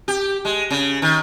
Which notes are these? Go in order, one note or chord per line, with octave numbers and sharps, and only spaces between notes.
G4
G#3
C#3
D#3